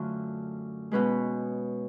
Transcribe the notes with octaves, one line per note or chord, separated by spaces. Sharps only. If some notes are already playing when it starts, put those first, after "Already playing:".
Already playing: F#2 D3 F#3 A3 F4
B2 G#3 C#4 F#4 B4